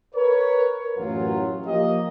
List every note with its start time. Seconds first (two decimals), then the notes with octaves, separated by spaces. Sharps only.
0.15 A#4 B4 C#5
0.97 A1 F#2 F#3 F4
1.66 F3 A#3 G4 D#5